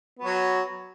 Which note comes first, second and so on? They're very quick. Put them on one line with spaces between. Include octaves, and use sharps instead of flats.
B3 F#4 F#3